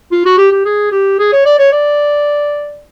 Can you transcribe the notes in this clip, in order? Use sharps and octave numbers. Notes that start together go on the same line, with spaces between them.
F4
F#4
G4
G4
G#4
G4
G#4
C#5
D5
C#5
D5